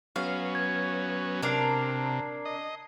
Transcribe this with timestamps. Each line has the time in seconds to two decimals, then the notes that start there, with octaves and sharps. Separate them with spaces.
0.16 F#3 B3 C#4 F5
0.55 G#6
1.42 C3 D4 A#4 A5 C7
2.45 D#5